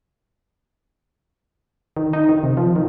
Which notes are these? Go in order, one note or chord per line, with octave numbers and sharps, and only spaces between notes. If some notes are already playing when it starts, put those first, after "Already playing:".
D#3
D#4
D#3
C3
F3
D#3